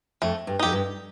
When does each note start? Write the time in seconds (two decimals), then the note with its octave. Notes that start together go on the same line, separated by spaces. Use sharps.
0.22 F2 A3
0.47 G2
0.59 F2 D#4 G4
0.72 G2